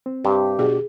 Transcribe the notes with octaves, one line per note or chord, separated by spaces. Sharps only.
C4
G2 C3 G4 G5
B2 D4 F#4 G#4